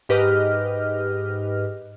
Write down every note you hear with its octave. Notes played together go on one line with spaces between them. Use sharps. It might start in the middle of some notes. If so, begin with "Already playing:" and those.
G#2 G4 B4 D#5 F6